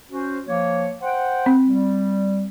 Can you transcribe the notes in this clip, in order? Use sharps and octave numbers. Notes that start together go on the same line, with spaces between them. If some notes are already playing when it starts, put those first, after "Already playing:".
C#4 F#4 C5
F3 A#3 C#5
C5 F#5 G5
C4
G3